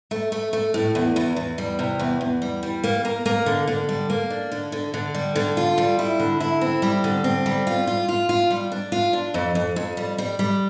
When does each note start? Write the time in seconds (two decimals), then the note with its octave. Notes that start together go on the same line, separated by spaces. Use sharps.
0.11 A3
0.32 A3
0.53 A3
0.74 A2
0.95 E2
1.16 E2
1.36 E2
1.58 G3
1.79 C3
1.99 E2
2.21 E2
2.42 G3
2.63 G3
2.84 A#3
3.05 A#3
3.26 A#3
3.46 D3
3.68 D3
3.89 G3
4.10 A#3
4.30 D4
4.52 D3
4.72 D3
4.94 D3
5.15 G3
5.36 D3
5.57 F4
5.78 G3
5.99 E4
6.20 D3
6.40 E4
6.61 C4
6.82 G3
7.04 D3
7.24 C4
7.46 G3
7.67 F4
7.87 F4
8.09 F4
8.29 F4
8.51 G3
8.72 D4
8.92 F4
9.13 D4
9.34 F2
9.55 F2
9.76 F2
9.97 G3
10.18 G3
10.39 G3